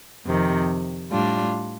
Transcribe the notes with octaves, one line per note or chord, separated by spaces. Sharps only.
F2 C3 D#3
A2 G3 D4 F4